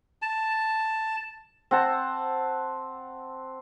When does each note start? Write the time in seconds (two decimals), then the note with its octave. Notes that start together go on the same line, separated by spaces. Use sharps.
0.22 A5
1.71 C4 F#5 A5